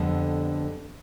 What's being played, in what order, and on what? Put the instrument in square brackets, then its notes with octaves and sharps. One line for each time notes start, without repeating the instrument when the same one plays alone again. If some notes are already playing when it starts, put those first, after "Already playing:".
Already playing: [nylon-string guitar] F2 D3 G3 B3